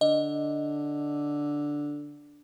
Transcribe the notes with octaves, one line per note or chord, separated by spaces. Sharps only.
D3 D#5